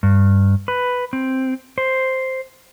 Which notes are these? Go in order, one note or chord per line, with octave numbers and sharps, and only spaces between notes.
G2
B4
C4
C5